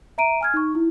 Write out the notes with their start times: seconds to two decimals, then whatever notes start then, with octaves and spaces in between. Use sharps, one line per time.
0.18 E5 A#5 D7 D#7
0.41 G#5 F6 G#6
0.54 D#4 C#6
0.75 E4